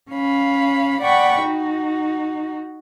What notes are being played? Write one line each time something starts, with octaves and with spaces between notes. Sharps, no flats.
C#4 F5 B5
D5 F#5 G5 B5 C#6
D#4 F#4